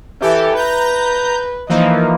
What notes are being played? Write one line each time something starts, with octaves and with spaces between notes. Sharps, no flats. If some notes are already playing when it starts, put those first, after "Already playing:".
E3 G4 A4
B4 A#5 G6
E3 F3 A#3 D#4